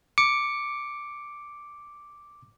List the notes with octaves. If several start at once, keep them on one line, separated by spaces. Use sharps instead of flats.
D6 C#7